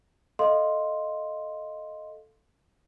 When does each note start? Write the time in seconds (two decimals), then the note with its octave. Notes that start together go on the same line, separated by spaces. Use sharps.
0.39 A4 D#5 F5 C6